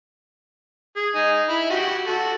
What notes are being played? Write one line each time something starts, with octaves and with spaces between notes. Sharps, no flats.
G#4
D#4 G#5
E4 B5
F#4 G4
F#4 A4